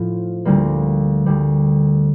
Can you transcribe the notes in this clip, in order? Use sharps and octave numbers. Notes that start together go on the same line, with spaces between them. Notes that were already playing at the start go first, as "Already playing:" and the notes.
Already playing: A2 F3
D2 D3 G3 A#3
D2 D3 G3